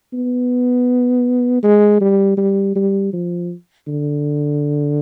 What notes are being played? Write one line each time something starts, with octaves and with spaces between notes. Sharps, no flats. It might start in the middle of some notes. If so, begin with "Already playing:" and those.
B3
G#3
G3
G3
G3
F3
D3